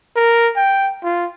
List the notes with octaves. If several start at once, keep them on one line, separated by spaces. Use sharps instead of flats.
A#4
G5
F4